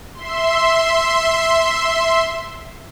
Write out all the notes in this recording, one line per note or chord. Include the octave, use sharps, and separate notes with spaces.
E5 C6